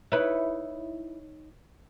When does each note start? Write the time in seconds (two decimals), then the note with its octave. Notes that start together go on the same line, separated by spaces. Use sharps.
0.12 D#4 E4 B4 C#5